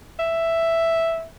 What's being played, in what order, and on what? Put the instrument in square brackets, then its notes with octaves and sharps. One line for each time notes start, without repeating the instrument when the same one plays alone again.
[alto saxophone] E5